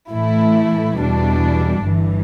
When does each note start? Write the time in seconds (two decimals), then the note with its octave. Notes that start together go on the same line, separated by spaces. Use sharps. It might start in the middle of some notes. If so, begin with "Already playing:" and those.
0.10 A2 E3 A3 E4
0.96 E2 B2 G3 D4
1.83 G1 G2 E3